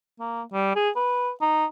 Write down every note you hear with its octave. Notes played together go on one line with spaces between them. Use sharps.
A#3
G3
G#4
B4
D#4